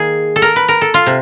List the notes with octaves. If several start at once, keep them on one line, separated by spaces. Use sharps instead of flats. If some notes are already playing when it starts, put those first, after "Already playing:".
Already playing: D#3 A#3 G#4
A4
A#4
B4
A#4
A4
F4
C3